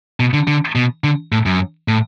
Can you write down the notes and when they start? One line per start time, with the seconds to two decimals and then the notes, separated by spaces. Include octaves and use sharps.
0.20 B2
0.33 D3
0.48 D3
0.75 B2
1.04 D3
1.32 A2
1.46 F#2
1.88 A2